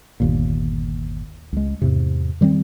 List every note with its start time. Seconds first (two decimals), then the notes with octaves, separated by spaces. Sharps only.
0.20 G1 D#2 A#2
1.52 C#2 G#3
1.82 E2 G#2 C3
2.41 D#3 G3 B3 C4